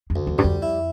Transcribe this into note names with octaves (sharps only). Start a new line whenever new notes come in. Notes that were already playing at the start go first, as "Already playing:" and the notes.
F2
D2
E2
G2 G3
F2
E4